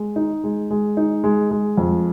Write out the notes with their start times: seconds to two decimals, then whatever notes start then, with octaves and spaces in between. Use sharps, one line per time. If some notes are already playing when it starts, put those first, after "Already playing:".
Already playing: G#3
0.16 D#4
0.44 G#3
0.71 G#3
0.97 D#4
1.24 G#3
1.51 G#3
1.77 F2